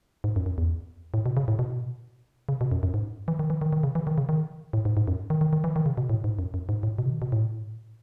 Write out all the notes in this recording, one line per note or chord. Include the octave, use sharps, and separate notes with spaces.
G#2
F#2
F#2
E2
A2
B2
C#3
A2
B2
C#3
B2
F#2
F#2
G#2
E3
D#3
E3
D#3
D#3
C#3
E3
D#3
C#3
D#3
A2
G#2
G#2
F#2
D#3
D#3
D#3
E3
D#3
C#3
B2
A2
G#2
F#2
F#2
G#2
A2
B2
C#3
D#3
B2
A2